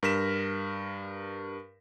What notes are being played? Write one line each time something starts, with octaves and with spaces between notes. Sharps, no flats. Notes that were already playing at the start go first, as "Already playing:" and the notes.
G2 A#4 F6 A#6 B6 E7